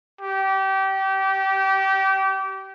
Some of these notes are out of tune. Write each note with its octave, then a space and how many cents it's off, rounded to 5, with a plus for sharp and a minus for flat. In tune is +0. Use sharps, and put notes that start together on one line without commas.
G4 -25